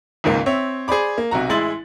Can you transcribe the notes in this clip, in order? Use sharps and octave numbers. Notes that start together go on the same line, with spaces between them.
G#1 C#2 G#2 A#3
C4 C#5 E5
G#4 C5 D5 B5 D6
A#3
B1 C3 F#4 A#5
A1 G#3 E4 C6 A6 F#7